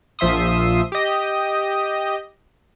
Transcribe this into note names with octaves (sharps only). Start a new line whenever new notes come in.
A#1 F3 E5 C6 D#6
G4 D#5